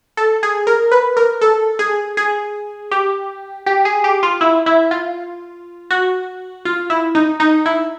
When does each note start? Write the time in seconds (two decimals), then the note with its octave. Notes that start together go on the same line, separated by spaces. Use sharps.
0.17 A4
0.43 G#4
0.67 A#4
0.92 B4
1.17 A#4
1.41 A4
1.79 G#4
2.17 G#4
2.91 G4
3.66 G4
3.85 G#4
4.04 G4
4.23 F4
4.41 E4
4.66 E4
4.91 F4
5.90 F#4
6.65 F4
6.90 E4
7.15 D#4
7.40 D#4
7.66 E4